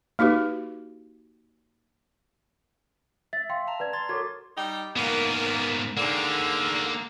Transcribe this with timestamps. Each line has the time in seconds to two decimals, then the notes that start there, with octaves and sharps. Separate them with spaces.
0.19 A#3 D#4 F#4 G4 B4
3.33 E5 A6
3.49 F5 G5 C6
3.67 A5 A#5
3.80 B4 D5 G#6
3.93 C6 G#6 A6
4.09 F#4 A4 A#4 C#5 D6 G#6
4.56 G3 D#4 G4
4.96 G#2 A#3 B3
5.97 G#2 D3 A#3 G4